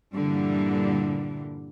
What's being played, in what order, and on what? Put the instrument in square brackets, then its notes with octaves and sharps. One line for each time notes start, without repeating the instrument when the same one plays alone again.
[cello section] G2 A#2 D3 E3 G3